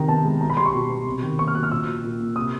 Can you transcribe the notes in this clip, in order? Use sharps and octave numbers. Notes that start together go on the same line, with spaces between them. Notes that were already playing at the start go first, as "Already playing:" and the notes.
Already playing: C3 D#3 A#5
B3 A5
G#3
B2 A#5
B5
G3 C6
C#6
B2
B3
C3
D#3
A#3 C#6
F6
F#3 F#6
F6
A#2 E6
F#3
A#2
A#3
C3 D#6